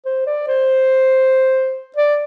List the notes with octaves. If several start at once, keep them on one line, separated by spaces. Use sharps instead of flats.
C5
D5
C5
D5